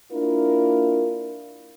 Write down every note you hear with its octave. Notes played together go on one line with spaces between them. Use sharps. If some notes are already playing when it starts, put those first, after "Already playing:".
A#3 D4 E4 F4 A#4